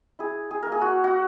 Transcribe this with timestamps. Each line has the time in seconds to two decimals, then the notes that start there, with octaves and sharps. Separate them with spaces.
0.19 E4 G#4
0.51 G#4
0.63 A#3 A#4
0.72 G#4
0.81 F#4
1.04 F#4